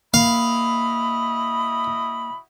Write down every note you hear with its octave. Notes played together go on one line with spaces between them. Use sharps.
A#3 E4 F#4 D#5 F5 B5